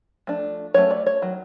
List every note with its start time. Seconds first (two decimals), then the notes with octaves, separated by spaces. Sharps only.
0.27 F3 A3 D4
0.74 F#3 A3 C#4 C#5
0.91 D5
1.06 C#5
1.22 D#3 F#3